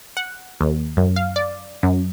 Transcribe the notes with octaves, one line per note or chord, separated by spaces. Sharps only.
F#5
D#2
F#2
F5
D5
F#2